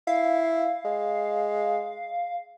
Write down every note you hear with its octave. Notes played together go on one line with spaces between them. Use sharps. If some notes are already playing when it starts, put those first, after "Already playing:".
E4 F5
G#3